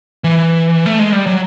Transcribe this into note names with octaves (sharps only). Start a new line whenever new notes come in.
E3
A3
G#3
G3
F#3